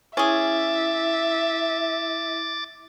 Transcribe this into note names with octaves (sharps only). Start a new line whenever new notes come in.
C#4 E4 G#4 E5 D6 A6